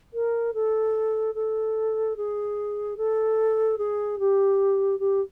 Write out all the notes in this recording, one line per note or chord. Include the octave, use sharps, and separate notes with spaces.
A#4
A4
A4
G#4
A4
G#4
G4
G4